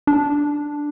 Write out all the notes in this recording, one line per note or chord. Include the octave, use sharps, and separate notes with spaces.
D4